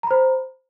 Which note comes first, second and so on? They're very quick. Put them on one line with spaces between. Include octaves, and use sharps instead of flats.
A#5 B5 C5